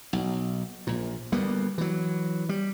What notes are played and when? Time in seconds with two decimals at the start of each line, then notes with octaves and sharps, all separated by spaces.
0.13 B1
0.87 A#1 A#2
1.32 D2 G3 A#3 B3
1.78 E3 F#3
2.49 G3